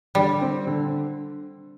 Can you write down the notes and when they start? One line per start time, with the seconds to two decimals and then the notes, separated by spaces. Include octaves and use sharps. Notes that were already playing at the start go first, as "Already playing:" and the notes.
0.15 D3 G3
0.41 C4
0.67 D3